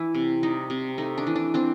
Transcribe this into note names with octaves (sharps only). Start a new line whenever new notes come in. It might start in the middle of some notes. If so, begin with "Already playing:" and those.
Already playing: E3 D4 E4
C3
G3 D#4
C3
A3 D#4
D4
E3
D4
C4 D4